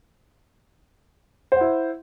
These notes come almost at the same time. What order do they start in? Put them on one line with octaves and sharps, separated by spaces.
C5 F#5 E4